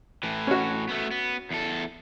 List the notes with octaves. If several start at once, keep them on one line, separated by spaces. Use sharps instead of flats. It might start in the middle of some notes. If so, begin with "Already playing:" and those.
A2 E3
C#4 F#4
A3 B3
B3
E2 A4